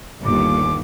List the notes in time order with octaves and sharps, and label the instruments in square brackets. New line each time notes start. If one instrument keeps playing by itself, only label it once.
[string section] G1 D#2 [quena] D6